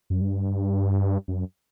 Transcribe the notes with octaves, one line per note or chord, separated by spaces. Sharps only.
F#2
G2
F#2